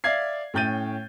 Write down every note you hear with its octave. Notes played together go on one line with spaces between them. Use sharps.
D5 E5 F5 G#6 C7
A2 C#4 G5 G6 A6 D#7